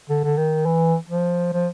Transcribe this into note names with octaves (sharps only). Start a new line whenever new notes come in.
D3
D3
D#3
E3
F3
F3